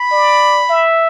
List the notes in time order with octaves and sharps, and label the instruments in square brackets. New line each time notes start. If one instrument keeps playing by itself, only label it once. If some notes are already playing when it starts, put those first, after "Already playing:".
Already playing: [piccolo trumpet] B5
[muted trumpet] D5
E5